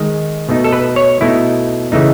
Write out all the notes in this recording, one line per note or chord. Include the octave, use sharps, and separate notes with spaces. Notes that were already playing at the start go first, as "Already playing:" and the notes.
Already playing: D#3 G#3 D#4
B2 A3 D#4
A4
B4
C#5
B2 A3 D#4 E4
C#3 E3 A3 D#4